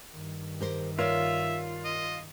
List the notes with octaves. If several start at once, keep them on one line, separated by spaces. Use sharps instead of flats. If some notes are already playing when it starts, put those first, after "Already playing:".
G2 D#3
G4 A#4 C5
F4 A#4 C#5 D5 E5
D#5